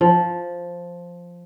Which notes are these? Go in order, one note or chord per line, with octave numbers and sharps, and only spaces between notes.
F3